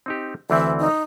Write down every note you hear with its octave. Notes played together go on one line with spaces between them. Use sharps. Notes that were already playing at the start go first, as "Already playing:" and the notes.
C4 D#4 G4
D2 E3 C4 E5
D#4